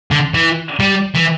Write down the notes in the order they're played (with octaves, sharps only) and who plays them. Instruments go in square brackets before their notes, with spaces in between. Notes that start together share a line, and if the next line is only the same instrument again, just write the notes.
[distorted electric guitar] D3
E3
G3
E3